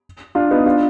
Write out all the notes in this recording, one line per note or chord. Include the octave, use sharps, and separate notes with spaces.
D4 F4
B3 D#4
D4 F4